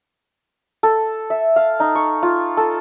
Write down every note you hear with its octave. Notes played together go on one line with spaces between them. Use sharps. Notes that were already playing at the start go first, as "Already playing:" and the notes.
A4
E5
F5
D#4
C#6
F4
A4